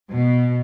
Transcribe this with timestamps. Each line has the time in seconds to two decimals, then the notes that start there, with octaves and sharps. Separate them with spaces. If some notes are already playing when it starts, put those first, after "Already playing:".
0.11 B2